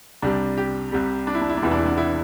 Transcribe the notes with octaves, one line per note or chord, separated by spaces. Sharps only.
C2 C3 G3 D4
G4
C2 C3 G3
D4
E4
D4
E4
D4
E1 E2 C3 E3 E4
D4
E4
D4
E4